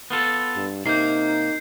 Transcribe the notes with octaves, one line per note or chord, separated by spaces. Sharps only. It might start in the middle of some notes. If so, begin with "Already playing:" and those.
B3 F4 A4
G2
C3 A#3 D#4 G6 C7